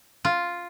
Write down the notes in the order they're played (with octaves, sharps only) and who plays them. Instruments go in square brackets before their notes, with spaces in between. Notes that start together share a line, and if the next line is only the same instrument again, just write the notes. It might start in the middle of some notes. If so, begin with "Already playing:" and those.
[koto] F4